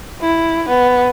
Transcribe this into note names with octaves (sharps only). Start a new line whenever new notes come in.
E4
B3